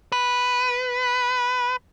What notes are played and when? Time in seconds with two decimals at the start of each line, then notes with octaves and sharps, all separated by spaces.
0.12 B4